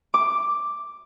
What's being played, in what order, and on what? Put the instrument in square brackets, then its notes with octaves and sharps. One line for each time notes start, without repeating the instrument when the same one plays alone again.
[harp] D6